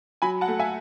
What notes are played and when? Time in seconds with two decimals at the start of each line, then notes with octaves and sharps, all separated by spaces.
0.22 F#3 G#5 B5
0.41 F#5 A5
0.48 A3
0.60 E5 G#5